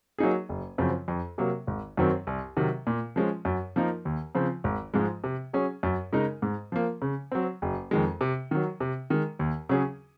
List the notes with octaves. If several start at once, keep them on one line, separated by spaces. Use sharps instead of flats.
F#3 A#3 D#4 G#4
F#1
F#2 C#3 F3 C4
F2
C3 F#3 A#3
G#1
F#2 D#3 F#3 C4
C2
C3 D#3 F#3
A#2
F3 G#3 C#4
F#2
F3 A#3 D#4 A#4
D#2
C#3 F3 C4
G#1
G#2 F3 G#3
C3
F#3 C#4 G#4
F#2
C#3 G#3 D#4 A#4
G#2
F3 A#3
C#3
F#3 C4
F#1
F2 D#3 G#3
C3
D#3 F#3
C3
D#3 G#3
D#2
C#3 F#3 C#4 G#4